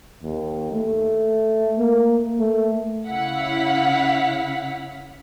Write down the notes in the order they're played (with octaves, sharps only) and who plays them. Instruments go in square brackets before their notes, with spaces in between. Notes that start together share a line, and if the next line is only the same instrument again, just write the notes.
[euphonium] D#2
A3
A#3
A3
[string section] C#3 E4 F5 F#5 B6